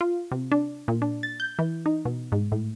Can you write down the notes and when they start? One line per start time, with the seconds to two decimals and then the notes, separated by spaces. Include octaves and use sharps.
0.01 F4
0.32 C3
0.52 D4
0.88 A#2
1.02 D4
1.23 A6
1.40 G6
1.59 E3
1.86 D#4
2.05 B2
2.32 G#2
2.52 A2